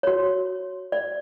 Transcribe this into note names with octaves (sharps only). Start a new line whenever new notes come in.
F#4 C#5
D5